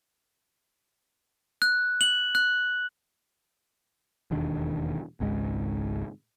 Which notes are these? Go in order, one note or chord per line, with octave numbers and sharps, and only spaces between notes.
F#6
F#7
F#6
E1 D#2 D#3 D4
G#1 C#2 G#2 G#3